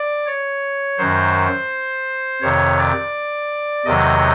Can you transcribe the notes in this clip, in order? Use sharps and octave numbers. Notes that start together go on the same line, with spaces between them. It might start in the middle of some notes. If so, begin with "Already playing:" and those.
Already playing: D5
C#5
F#2 D#3 F#3 C5
F2 C3 D#3 C#5
D5
E2 C3 D#3 F#3 D#5